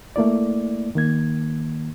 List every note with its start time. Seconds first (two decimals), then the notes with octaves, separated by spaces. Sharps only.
0.16 A3 A#3 E4 D5
0.95 D#3 A#3 G#6